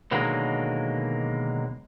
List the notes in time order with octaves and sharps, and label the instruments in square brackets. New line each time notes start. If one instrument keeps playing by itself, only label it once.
[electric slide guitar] B2 D3 D#3 F#3 G#3 A#3